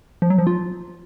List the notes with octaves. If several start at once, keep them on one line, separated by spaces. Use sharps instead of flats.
F3
F#3
F3
F4